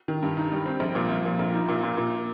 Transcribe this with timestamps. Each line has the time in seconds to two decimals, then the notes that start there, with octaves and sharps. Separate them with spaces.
0.08 D#3
0.23 G2
0.37 D#4
0.52 G3
0.66 C4
0.80 A#1
0.95 A#2
1.10 F3
1.25 A#2
1.39 A#1
1.54 D#4
1.68 A#2
1.83 A#2
1.97 A#2